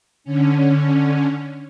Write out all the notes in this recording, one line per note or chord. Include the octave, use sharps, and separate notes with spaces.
D3 C#4